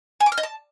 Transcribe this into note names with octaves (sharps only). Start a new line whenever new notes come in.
G#5
D6
F6
D#5
A5